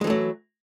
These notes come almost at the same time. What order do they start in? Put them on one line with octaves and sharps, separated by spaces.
G#3 E3 A3 F#3